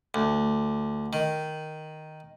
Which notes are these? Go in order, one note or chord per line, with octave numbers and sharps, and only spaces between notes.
D2
D#3